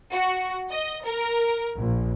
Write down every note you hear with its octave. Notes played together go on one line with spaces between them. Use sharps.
F#4
D#5
A#4
A#1